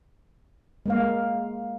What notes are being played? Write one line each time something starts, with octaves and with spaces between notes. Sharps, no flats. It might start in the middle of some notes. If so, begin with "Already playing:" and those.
G#3 A#3 F5